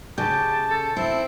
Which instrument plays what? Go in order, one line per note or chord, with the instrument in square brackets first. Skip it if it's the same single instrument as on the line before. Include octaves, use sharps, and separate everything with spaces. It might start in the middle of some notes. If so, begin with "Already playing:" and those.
[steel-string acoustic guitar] C#3 [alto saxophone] G4 [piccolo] A5 [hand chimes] G6
[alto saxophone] A4
[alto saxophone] C4 [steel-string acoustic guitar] E4